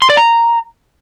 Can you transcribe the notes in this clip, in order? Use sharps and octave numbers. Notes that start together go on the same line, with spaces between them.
C6
D5
A#5